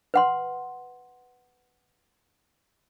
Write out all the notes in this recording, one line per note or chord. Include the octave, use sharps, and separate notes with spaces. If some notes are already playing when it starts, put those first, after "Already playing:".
B4 F#5 C6